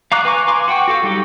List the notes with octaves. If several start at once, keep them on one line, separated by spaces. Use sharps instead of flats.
F5 A#5 D6 F#6
B4 G#5 A#5 C#6 D6
F5 G#5 C6 D6
F#4 F#5 G5 C#6
F#4 A4 F5 G5
F#3 G3 D#4 G4